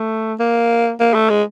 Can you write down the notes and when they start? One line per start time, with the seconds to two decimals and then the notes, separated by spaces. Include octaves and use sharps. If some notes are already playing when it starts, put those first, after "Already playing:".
Already playing: A3
0.40 A#3
1.00 A#3
1.14 A3
1.29 G#3